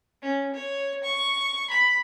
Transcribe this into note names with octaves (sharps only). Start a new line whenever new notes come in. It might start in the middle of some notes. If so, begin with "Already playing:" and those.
C#4
C#5
C#6
B5